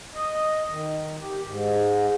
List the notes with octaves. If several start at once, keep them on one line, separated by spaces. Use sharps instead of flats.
D#5
D#3
G4
G#2